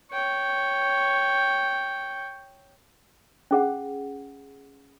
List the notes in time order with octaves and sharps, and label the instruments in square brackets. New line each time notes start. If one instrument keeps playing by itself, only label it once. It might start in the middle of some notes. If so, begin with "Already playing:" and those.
[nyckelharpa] C#5 G5
[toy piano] C#4 G#4 F#5